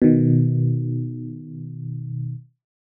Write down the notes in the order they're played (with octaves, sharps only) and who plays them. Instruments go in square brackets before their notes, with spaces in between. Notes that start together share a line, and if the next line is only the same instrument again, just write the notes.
[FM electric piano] B2 D#3